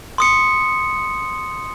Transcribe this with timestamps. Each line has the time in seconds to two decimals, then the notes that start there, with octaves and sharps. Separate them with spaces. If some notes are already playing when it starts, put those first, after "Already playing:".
0.18 C6 D#6 C#7